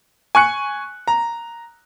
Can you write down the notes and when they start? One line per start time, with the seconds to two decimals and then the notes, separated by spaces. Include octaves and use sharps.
0.35 G#5 C#6 F#6 C#7
1.08 A#5